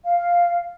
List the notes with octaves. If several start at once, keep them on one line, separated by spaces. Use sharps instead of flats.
F5